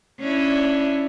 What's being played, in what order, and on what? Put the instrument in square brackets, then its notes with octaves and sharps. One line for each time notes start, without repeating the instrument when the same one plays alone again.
[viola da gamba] C#4 D4 E4